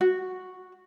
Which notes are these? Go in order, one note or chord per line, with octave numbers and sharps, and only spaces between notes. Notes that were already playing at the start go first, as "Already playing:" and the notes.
F#4